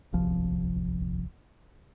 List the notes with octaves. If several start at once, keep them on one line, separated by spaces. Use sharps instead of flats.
D1 G1 C2 F3